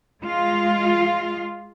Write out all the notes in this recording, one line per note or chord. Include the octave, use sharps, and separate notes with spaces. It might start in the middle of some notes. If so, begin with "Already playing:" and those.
G#3 F4